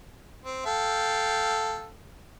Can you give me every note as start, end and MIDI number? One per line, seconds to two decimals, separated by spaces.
0.45 0.65 60
0.66 1.89 69
0.66 1.89 77
0.66 1.89 79